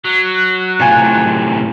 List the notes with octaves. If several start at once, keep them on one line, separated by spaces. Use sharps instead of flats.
F#3 F#6
A2 C3 F4 G#5